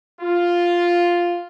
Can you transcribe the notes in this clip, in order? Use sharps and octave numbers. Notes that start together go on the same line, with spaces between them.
F4